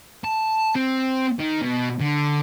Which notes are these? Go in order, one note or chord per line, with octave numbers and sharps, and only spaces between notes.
A5
C4
D#3
B2
D3